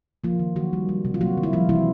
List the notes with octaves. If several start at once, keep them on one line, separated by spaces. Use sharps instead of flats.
F3 A#3 F4
D#3
D#3 F#3 F#4
G3
G3
C3
F4
F#3 A#3 F#4
D#3
E4
F3 G3 F4
C3 E3 E4